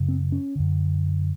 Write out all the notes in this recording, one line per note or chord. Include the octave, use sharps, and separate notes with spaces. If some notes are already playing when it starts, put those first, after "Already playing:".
Already playing: F#2 C#3
C4
C#4
F#2 D3